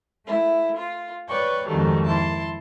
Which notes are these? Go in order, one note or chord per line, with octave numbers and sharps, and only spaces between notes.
A3 E4
F4
B4 C#5 D5 G5 C#6
F2 G#2 D#3 F#3 G3 A3
E4 A5 C6